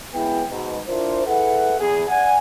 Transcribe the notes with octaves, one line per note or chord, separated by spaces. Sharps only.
F#2 G#3 B3 E4 G#4 G5
G#2 B2
D4 E4 F4 A#4 C5
E4 G#4 A4 B4 E5 F#5
E2 G#4
D5 F#5 G#5